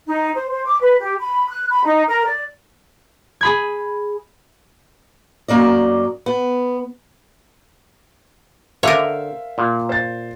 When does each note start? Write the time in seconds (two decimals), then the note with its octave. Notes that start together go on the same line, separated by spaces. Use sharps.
0.07 D#4
0.35 C5
0.50 C5
0.65 D6
0.81 B4
0.99 G4
1.19 B5
1.49 F#6
1.69 B5
1.85 D#4
2.08 A#4
2.26 D5
3.41 G#4 B5 G#6
5.48 F#2 A#3 D5 D#5
6.26 B3
8.83 D3 A#4 C5 C#5 E5 F5 A5
9.58 A#2
9.89 C5 A6